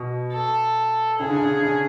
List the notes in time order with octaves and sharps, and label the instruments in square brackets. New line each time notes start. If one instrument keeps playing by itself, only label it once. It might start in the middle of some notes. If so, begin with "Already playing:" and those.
Already playing: [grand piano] B2
[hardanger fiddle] A4
[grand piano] C#3 [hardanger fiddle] G#4
[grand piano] D3
C#3
C#3